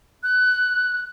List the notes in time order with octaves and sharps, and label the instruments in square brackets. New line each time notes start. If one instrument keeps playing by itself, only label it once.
[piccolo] F#6